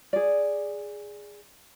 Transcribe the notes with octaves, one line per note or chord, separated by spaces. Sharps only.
G#4 D5